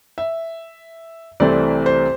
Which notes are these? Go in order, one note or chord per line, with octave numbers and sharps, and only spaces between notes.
E5
C2 C3 E3 A3 C4 D5
C5